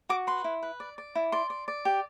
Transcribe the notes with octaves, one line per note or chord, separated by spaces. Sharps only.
F#4 D6
B4 C6
E4
B4
D5
D5
E4
D5 C6
D5
D5
G4